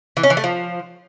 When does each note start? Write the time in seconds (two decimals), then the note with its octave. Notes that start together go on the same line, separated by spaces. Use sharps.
0.17 E3
0.23 C#4
0.30 E3
0.37 A3
0.44 F3